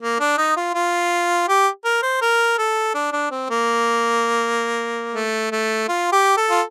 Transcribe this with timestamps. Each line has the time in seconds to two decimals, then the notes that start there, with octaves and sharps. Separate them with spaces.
0.02 A#3
0.20 D4
0.38 D#4
0.57 F4
0.74 F4
1.48 G4
1.85 A#4
2.02 C5
2.21 A#4
2.58 A4
2.94 D4
3.12 D4
3.31 C4
3.50 A#3
5.15 A3
5.52 A3
5.89 F4
6.12 G4
6.37 A4
6.50 F4